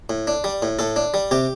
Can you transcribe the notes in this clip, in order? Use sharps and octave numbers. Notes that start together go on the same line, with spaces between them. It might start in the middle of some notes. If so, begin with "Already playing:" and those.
A2
D4
G3
A2
A2 A4
D4
G3
C3 G4